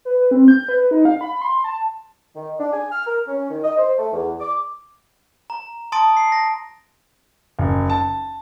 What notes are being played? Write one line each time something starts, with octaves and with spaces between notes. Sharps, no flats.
B4
C4
G6
B4
D#4
F5
B5
C6
A5
D#3
D4
G#5
F6
A#4
C#4
D#3
D#5
C5
A3
E2
D6
A#5
A5 C6 D#6 A6 D7
C7
A#6
F#1
A5